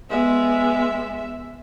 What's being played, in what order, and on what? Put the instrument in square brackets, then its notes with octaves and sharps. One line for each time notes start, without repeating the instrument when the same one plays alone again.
[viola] G#3 B3 [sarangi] E5